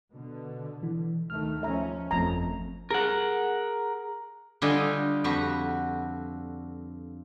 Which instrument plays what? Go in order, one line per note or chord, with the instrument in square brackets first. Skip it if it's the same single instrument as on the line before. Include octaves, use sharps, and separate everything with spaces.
[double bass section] B2 D3
[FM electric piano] E3
[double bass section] D2 D#3 A3 [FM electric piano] F6
[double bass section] F3 C#4 [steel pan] E5 A#5
[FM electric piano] G1 F3 C4 [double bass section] F2 A3 [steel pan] A#5
[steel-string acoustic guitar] G#4 [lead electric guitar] A#4 F#5
[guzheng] D3 G3 F4 D#5 G#5
F2 F#4 B4